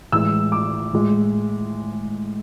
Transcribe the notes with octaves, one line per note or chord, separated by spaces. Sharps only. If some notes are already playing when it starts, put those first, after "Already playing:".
A2 E3 G#3 E6
D6
A2 G#3